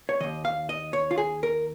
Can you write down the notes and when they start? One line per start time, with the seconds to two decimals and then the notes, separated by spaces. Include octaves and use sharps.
0.09 C#5
0.20 D#2 D#3 D#5
0.45 F5
0.69 D#5
0.93 C#5
1.11 F4
1.18 G#4
1.43 A#4